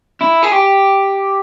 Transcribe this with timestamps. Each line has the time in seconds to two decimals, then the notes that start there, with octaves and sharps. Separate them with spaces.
0.22 E4
0.44 G#4
0.53 G4